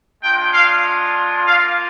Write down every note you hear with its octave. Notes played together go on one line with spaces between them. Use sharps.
G#3 D4 F4 G5
F5
A#3 F4 F5